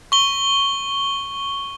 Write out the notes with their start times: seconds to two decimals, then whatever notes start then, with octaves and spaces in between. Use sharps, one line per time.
0.12 C#6 G7